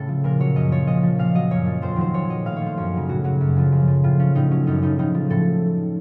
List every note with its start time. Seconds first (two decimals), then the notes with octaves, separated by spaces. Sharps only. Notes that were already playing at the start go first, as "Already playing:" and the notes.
Already playing: A2 C#3 A4
0.09 F3
0.24 A#2 A#4
0.40 F#3 C#5
0.56 F#2 D#5
0.71 F3 C#5
0.87 A#2 D#5
1.03 F3
1.19 A#2 F5
1.35 F#3 D#5
1.51 F#2 C#5
1.67 F3
1.82 F2 C5
1.96 D#3 F#3 C5
2.14 A#2 C#5
2.29 F#3 D#5
2.45 A2 F5
2.56 C#5
2.61 F3 C5
2.77 F#2 C#5
2.93 C#3 F#3
3.09 A2 F#4
3.24 F#3 F#4
3.41 F#2
3.56 C#3 F3
3.72 F#2
3.88 F3
4.04 A2 F4
4.19 F3 C#4
4.35 A2 D#4
4.51 F#3 C#4
4.67 F#2 D#4
4.82 C#3 F3 D#4
4.99 A2 D#4
5.14 F3
5.30 A2 A4